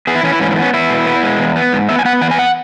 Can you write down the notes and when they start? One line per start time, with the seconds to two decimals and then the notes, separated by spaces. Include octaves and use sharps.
0.07 B3 G#4
0.15 E4
0.23 E3 C#4
0.32 E4
0.40 G#2 C#4
0.51 C#4
0.56 B3
0.62 C#4
0.74 B3 E4
0.90 B2
1.06 B3
1.23 G#3
1.39 E2
1.56 B3
1.72 G#2
1.89 B3 E5
1.99 G#5
2.05 B3 F#5
2.21 E3 F#5
2.31 G#5
2.39 F#5